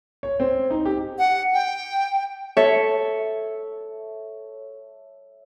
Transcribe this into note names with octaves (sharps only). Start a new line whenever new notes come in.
C#5
C4
D#4
G4
F#5
G5
A4 C#5 E5